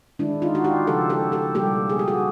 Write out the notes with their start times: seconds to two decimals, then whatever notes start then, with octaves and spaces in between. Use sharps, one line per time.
0.19 D#3 G#3 D4 E4
0.42 D#4 F4
0.55 F#4
0.64 F4 G4
0.87 C#3 F3 G#3 G4 A4
1.10 G4 A4
1.32 G4 A4
1.55 B2 G3 A#3 G4 A4
1.90 G#4
1.99 G4
2.08 F#4 G#4